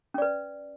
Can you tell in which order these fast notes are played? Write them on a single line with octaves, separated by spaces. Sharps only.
C#4 D5 B4